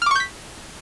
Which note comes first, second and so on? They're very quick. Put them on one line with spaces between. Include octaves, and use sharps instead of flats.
F6 D6 C#6 G6 B6